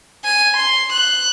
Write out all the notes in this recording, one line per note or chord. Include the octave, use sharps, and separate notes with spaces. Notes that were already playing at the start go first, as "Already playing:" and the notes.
G#5
C6
F#6